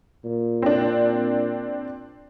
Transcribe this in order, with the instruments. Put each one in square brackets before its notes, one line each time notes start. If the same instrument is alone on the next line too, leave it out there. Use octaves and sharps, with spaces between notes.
[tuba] A#2
[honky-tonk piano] C4 D4